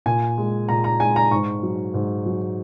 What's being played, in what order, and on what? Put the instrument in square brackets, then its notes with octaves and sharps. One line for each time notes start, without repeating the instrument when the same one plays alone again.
[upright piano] A#2 G#5
G#3
A#2 A#5
A#5
G#3 G#5
A#5
G#2 C#6
F#3
G#2
F#3